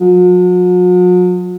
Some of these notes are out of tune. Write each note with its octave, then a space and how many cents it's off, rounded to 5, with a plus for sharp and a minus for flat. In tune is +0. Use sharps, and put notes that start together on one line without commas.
F#3 -45